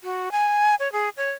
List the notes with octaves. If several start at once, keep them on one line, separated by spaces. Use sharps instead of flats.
F#4
G#5
C#5
G#4
C#5